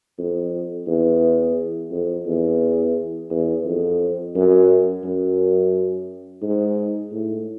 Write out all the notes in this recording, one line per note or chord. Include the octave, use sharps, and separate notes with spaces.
F2
E2
F2
E2
E2
F2
F#2
F#2
G#2
A2